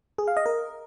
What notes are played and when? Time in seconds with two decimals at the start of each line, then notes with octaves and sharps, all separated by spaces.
0.18 G#4
0.28 F5
0.37 D#5
0.46 A#4